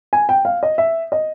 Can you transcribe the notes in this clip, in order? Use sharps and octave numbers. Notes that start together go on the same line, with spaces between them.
G#5
G5
F5
D#5
E5
D#5